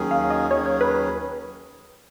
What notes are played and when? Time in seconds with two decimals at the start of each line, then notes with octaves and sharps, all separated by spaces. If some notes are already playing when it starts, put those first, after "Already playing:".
Already playing: D#2 D#3 F#3 C#4 G#4
0.11 F5
0.30 D#5
0.51 D#2 D#3 F#3 C#4 G#4 C#5
0.66 C#5
0.81 B4